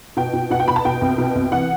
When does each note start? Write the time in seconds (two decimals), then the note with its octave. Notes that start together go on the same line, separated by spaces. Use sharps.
0.17 B2 G5
0.33 B2
0.51 B2 F#5
0.60 G5
0.68 B2 B5
0.76 A5
0.85 B2 G5
1.01 C2
1.18 B2
1.35 C2
1.52 E3 F#5